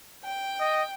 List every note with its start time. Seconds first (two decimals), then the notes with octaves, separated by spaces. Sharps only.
0.24 G5
0.60 D#5